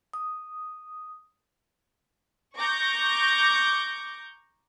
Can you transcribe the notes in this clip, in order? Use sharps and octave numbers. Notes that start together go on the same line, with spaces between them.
D#6
A#5 C#6 D6 G6 A#6